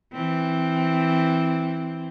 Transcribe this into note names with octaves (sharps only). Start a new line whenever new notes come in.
E3 C4